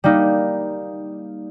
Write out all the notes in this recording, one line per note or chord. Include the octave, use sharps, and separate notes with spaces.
G3 A#3 D#4